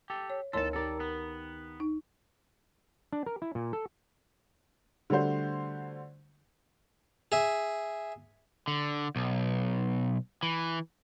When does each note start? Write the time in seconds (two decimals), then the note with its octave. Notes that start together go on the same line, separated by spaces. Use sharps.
0.10 G4 A4
0.30 C#5
0.53 D2 E3 A#3 D#4 A4 C#5 A5 C6
0.73 D#3 G4 A4 A#4 D5
1.00 B3
1.80 D#4
3.13 D4
3.26 A#4
3.42 E4
3.55 A#2
3.73 A4
5.10 D3 G3 A3 F#4 C5
7.32 G#4 E5
8.68 D3
9.16 B1
10.43 E3